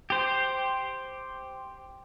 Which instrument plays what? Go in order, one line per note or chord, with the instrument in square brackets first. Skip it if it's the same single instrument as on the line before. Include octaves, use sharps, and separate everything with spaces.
[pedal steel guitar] G4 C5